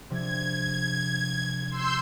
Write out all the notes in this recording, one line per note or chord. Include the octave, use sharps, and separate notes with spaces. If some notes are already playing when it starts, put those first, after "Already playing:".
C3 F3 D4 G#6
C6 E6 G6